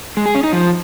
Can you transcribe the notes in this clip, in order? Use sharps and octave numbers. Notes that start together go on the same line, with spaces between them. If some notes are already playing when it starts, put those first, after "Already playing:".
G#3
G#4
C#4
D#4
F3